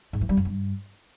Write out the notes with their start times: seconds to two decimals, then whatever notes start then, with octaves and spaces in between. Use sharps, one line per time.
0.13 G#2
0.21 E3
0.29 G3
0.37 F#2
0.45 G2